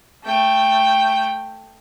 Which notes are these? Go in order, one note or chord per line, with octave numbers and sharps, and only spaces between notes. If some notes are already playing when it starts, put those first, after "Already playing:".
A3 G5